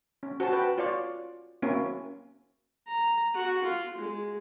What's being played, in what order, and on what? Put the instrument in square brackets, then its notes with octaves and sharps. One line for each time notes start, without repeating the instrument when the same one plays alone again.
[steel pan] C#4
F#4 C5 G#5 A5
B4 G5
F4 C#5 D5 F5
A#3 C4 C#4 E4 F#4 G#5
[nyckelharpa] A#5
F#4
F4
G#3